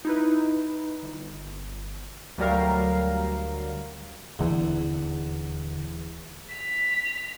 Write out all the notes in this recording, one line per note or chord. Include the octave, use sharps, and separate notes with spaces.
D#4 E4 B4
G1
D2 F#3 G3 A#4 F5
D#1 E2 D3 E3
B6 F7